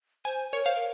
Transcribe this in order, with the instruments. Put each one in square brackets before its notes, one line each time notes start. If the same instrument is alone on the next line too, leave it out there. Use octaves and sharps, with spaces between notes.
[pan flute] C5 [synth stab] G#5
[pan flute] A#4 [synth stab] C#5
[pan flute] C5 [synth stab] F5
[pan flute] A#4